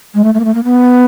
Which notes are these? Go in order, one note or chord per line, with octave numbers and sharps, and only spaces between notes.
G#3
A3
A3
A#3
A3
A#3
B3